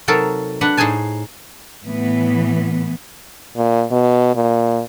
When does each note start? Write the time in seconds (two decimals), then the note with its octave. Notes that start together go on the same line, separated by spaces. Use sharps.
0.08 C3 F#3 D#4 A4 A#4 A5
0.61 D4 B4 F#5
0.77 A2 D#4 G#4 C5 G#5 A5
1.85 A2 E3 B3
3.57 A#2
3.91 B2
4.35 A#2